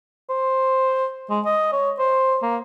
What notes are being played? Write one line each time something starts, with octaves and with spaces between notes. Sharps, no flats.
C5
G#3
D#5
C#5
C5
A#3